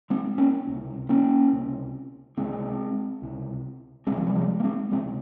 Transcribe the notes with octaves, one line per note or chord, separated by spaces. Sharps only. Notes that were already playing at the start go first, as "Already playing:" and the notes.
G#3 C4
A#3 C#4
C#2 C3
A#3 C#4
C#2 C3
C#2 C3 G#3 C4
C#2 C3
C#2 C3 G#3 C4
F3
G3
F3 G#3
A#3
G#3 C4
C#2 C3 G#3 C4